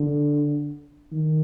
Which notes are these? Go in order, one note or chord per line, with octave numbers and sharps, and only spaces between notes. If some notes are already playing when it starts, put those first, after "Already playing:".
Already playing: D3
D#3